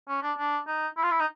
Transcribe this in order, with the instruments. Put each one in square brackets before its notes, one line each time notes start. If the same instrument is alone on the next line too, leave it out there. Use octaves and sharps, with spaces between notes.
[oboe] C#4
D4
D4
D#4
E4
F4
E4
D#4